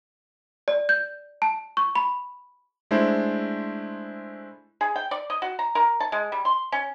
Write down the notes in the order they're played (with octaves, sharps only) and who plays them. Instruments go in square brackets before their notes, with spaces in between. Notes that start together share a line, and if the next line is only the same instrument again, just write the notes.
[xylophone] D5
G6
A5
C#6
B5
[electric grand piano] G#3 A3 D4 E4 C5
[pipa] G#4
G5
D5
D#5
F#4
A#5
A#4
A5
G#3
G3
C6
C#4